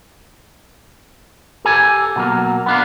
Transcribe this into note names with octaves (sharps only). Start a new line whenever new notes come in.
G4 A4 G#5
B2 F#3 A#3
B3 D4 F5